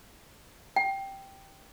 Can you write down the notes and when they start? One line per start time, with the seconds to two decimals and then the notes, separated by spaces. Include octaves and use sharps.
0.76 G5